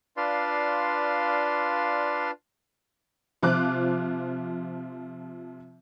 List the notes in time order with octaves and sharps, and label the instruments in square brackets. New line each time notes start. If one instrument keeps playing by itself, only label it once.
[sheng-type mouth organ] D4 F4 B4 D5 F5 C6
[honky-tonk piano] C3 F3 F4 D6 F#6